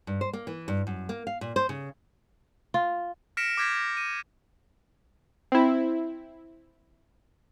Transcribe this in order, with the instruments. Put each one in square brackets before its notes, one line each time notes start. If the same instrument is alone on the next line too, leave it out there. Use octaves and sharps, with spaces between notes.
[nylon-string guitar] G2
C5
A#3
E3
G2
F#2
A#3
F5
A#2
C5
C#3
[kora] F4
[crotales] F6 A#6 B6 C#7 D7 E7
D6 F6 G6 G#6 A#6 B6
A#6
D#7
[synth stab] C4 E4